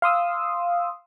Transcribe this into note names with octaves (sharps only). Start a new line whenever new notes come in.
F5 C6 D#6 E6